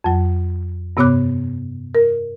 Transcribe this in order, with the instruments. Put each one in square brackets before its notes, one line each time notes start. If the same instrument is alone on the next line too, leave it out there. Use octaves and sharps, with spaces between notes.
[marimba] F2 F#3
G2 C3 B3 C#5 D6 F#6
A#4